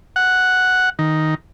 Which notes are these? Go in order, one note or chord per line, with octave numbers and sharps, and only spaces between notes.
F#5
D#3